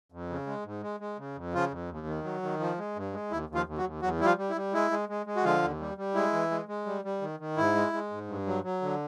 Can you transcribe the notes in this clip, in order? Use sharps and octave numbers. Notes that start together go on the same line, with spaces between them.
F2
C#3
G#3
G#2
G#3
G#3
C#3
F2
C#3 F3 F4
F2
D#2
D#3
F#3
D#3
F3
G#3
G2
G#3
D#2 E4
D#2
F3 F4
D#2
F#3 F#4
D#2
E2 F#3 F#4
G3 E4
F3 F4
G3
E4
G3
G#3 E4
G#3
G#3
G#3
F#4
D3 F3 F4
D#2
G3
G3
G#3 E4
E3
G#3
G#3
G3
G3
D#3
D#3
G#2 E4
G#3
G#3
G#2
G2
F#3
F#3
D3